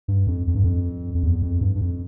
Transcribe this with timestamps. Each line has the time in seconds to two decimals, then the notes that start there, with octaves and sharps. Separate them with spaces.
0.08 G2
0.27 F2
0.47 F2
0.55 G2
0.64 F2
1.15 F2
1.23 E2
1.42 F2
1.61 G2
1.76 G2
1.81 F2